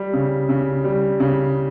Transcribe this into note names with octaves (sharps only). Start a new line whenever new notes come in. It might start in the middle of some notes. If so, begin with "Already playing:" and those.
Already playing: G3
C#3
C#3
G3
C#3